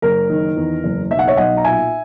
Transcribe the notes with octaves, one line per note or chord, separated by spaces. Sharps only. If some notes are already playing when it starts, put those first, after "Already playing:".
F#1 A#4
D#3
E2
F#1
B1 E5
F#5
C#5 E5
B1 D#5 F#5
A#5
A#2 E5 G#5